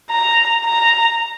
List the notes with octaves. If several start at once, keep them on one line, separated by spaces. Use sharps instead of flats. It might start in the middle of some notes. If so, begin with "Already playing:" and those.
A#5
A#5